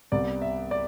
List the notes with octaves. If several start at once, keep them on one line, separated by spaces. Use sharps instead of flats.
C2 C3 G3 B3 D5
E5
D5